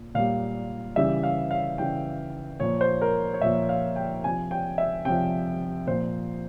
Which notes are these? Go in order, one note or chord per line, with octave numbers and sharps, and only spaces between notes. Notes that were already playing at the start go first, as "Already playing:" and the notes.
Already playing: A#2
A#2 G3 F5
C#3 E3 G3 E5
F5
F5
C#3 E3 G3 G5
A#2 F3 C#5
C5
A#4
C#5
A#2 F3 E5
F5
G5
C3 F3 G#5
G5
E5
C3 F3 G5
A#2 F3 C5